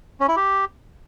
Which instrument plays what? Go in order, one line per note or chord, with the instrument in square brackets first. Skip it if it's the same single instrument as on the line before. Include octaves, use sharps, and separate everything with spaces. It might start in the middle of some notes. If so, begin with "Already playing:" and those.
[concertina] C#4
E4
G4